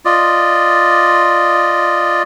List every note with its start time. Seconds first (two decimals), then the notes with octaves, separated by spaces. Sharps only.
0.05 F4 D5 D#5